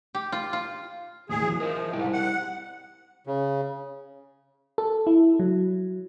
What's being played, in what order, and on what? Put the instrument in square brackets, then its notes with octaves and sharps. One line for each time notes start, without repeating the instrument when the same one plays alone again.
[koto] G4
F4
F4
[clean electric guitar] D#2 A2 G4 [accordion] G#4
[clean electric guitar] E3 F#3
[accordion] F3 [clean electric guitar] A#4 D#5 E5
[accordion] G#2 [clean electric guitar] G3 E4 G5
[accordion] F#5
[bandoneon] C#3
[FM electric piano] A4
E4
F#3